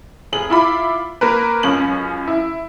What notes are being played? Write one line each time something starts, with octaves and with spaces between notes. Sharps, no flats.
F1 G#4 F#7
E4 F4 B5 D6
A#3 A#4 B4
C#2 F#2 C#4 F#7
E4